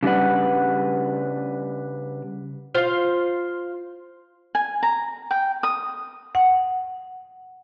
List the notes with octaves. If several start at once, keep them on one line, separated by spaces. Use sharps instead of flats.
C#3 G3 D4 B4 F#5
F4 C5 F5
G#5
A#5
G5
D#6
F#5